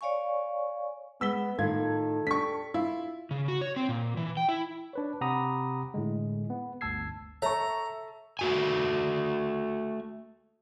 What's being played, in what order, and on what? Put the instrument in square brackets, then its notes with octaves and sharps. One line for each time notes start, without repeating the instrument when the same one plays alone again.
[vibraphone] C#5 D5 F5 G#5 C#6
[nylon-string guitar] G#3 [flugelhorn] B3 [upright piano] E6 B6 G7
[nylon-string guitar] A2 D#3 F4 [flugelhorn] A4 [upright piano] G#6
[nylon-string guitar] D4 G4 [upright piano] C#6 B6
[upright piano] E4 [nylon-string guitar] F4
[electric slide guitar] C#3
F#4
C#5
C4
A#2
E3
G5
E4
[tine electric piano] D4 B4 C#5
C3 G4 F#5 A#5 B5 D#6
A2 D3 G#3
B3
G1 D2 A5 E6 G#6 C7
[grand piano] A4 A5 [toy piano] C#5 [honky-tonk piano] E5 C#6 [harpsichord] A#5
[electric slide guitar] A3 F#4 G#5